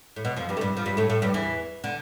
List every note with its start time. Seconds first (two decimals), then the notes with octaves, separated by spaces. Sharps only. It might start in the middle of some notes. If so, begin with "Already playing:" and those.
0.16 A2
0.25 B2
0.36 F2 F3
0.49 G2 G3
0.57 A3
0.61 G2 G3
0.77 F3
0.86 G2 G3
0.97 A2 A3
1.10 A2 A3
1.22 G2 G3
1.34 E2 E3
1.84 D3